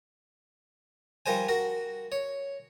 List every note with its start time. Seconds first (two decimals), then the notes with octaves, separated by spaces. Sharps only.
1.26 F3 G3 A#4 C5 G#5
1.48 F#4 A#4
2.12 C#5